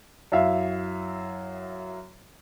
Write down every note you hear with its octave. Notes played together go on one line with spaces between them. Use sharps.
F#2 E4 E5 F5